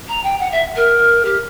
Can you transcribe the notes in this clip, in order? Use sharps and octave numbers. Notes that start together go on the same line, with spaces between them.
A#5
G5
F#5
E5
A#4
G4